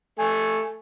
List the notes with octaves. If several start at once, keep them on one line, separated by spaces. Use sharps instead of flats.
A3 G#5